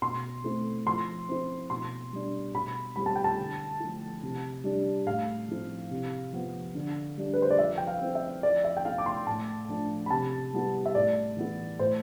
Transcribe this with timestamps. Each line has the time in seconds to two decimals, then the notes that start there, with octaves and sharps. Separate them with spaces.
0.02 B2 C6
0.44 A3 C4 E4
0.86 F3 C6
1.29 C4 E4
1.70 B2 C6
2.13 G3 D4
2.54 B2 B5
2.96 G3 C4 E4 B5
3.06 A5
3.16 G5
3.24 A5
3.38 D3
3.80 F3 A3 E4
4.23 C3
4.64 G3 D4
5.07 A2 F5
5.48 F3 C4 E4
5.91 C3
6.33 F3 B3
6.75 D3
7.17 G3 D4
7.34 B4
7.42 C5
7.50 D5
7.59 F3 E5
7.78 G5
7.87 F5
8.01 C4 E4
8.15 E5
8.43 F3 D5
8.64 E5
8.77 G5
8.85 B3 E4 F5
8.98 D6
9.06 C6
9.27 A2 A5
9.69 F3 A3 D4
10.06 B5
10.11 C3 A5
10.53 G3 B3 E4
10.86 E5
10.95 A2 D5
11.37 E3 B3 E4
11.79 A2 C5